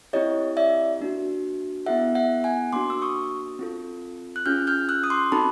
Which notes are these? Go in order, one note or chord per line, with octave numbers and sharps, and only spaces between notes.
C4 E4 G4 C#5 D#5
D5 E5
A#3 D4 F#4
B3 E4 G#4 E5 F#5
E5 F#5
F#5 G#5
A#3 D4 F#4 C6 D6
E6
C#6 D#6
C4 F4 A4
F#6
C#4 F4 G#4 F6 G6
F6 G6
E6 F#6
D#6
C6 D6
C4 D#4 F#4 A4 A5 B5